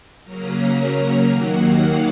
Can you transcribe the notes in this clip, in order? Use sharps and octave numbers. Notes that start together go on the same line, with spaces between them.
C#3 F#3 A#3 C#4 A#5
A#5
D#2 D#3 F#3 A#3 F#5
F5